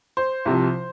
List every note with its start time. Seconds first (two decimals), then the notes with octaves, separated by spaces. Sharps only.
0.17 C5
0.45 C2 C3 F3